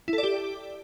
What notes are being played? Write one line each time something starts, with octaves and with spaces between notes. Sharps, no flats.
E4
A4
D5
G4